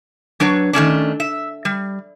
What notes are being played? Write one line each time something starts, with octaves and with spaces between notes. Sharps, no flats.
F#3 D4 B4 C#5
D#3 A3 C#4 D4
E5
G3